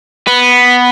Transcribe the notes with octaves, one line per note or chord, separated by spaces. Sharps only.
B3